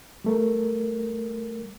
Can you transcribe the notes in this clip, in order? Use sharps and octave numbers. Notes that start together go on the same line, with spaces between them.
G3 A3 A#4